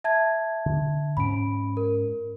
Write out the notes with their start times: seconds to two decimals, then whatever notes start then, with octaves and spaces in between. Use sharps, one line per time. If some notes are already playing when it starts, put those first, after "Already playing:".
0.04 E5 A5 G#6
0.66 D3
1.17 G#2 C#4 B5 D7
1.77 A#4